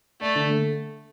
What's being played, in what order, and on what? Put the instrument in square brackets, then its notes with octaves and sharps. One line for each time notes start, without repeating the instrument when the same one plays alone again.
[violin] A3 [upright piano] D5
[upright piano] D3
A3